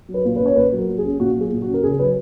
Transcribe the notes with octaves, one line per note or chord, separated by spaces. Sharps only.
F#3
B4
A#2
B4
C#4
C#5
A#2 B4
F#3
A#4
A#2
G#4
C#4
A#2 F#4
F#3 G#4
A#2
F#4
C#4
A#4
C#3 G#4
F#3 B4